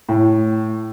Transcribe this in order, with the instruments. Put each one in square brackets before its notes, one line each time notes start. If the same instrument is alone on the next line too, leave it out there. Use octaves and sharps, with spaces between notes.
[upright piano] A2